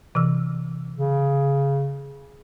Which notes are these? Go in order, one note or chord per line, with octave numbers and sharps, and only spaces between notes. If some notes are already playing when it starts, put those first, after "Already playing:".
C3 E3 E6
C#3